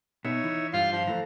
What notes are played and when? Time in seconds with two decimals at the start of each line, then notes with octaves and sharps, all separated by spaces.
0.25 B2 D#4 C#5 E5
0.44 E3
0.73 G2 F4 C5 C6
0.92 F3
1.07 E3 A3 A#5